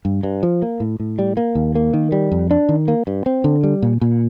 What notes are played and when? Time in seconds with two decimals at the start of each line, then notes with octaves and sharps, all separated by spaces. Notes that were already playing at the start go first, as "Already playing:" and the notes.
0.05 G2
0.23 G2
0.43 F3
0.62 A#3
0.80 A2
1.00 A2
1.19 G3
1.37 A#3
1.55 D#2
1.75 A#3
1.94 D#3
2.12 G3
2.32 F2
2.51 D4
2.69 D#3
2.88 A#3
3.07 G2
3.26 C4
3.44 D3
3.63 G3
3.83 A#2
4.01 A#2